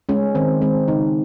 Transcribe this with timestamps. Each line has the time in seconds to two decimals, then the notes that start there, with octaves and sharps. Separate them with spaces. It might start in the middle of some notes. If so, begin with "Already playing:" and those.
0.09 G#3 C#4
0.35 D#3 C4
0.62 G#3 C4
0.88 C#3 D#4